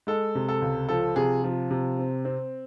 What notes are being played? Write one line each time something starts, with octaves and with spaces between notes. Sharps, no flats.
G#3 A4
C3
A4
C#2
F3 A4
C3 G#4
F3
C3
C4
C4